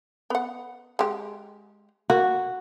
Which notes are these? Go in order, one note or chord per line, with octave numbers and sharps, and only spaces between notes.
B3 F#5
G#3 G4
A#3 F#4